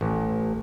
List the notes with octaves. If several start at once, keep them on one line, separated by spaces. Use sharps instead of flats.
A1